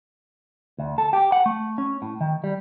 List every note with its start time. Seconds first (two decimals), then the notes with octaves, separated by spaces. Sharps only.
0.78 D2
0.98 A4
1.13 G4
1.32 F#5
1.46 A3
1.78 C#4
2.02 A2
2.20 D#3
2.44 G3